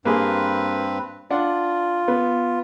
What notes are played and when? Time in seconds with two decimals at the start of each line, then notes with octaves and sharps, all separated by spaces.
0.05 G2 A#3 C4 G4 G#4 B4
1.31 D4 F4 F#5
2.08 B3